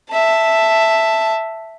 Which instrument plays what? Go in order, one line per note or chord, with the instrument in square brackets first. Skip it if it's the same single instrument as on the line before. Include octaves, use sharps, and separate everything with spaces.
[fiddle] E5 A5